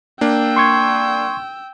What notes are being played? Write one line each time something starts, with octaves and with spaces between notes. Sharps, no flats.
A#3 D4 G5 E6
C6 C#6 G#6